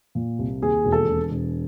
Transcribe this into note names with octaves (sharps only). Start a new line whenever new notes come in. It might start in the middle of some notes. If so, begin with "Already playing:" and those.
A#2
C2
D#2 G#4
E1
A4
E1
E1